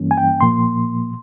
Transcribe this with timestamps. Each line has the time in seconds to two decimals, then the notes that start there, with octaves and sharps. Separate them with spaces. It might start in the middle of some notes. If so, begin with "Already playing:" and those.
Already playing: G2 E3 G3 A#3 C#4
0.11 G#5
0.17 G5
0.41 A#2 F3 A#3 C6